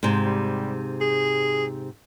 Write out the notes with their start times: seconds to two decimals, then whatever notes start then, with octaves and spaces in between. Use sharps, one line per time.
0.03 G#2 C3
0.25 G3
1.01 G#4